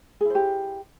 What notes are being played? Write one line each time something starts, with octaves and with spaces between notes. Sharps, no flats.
E4 G4 G#4 C5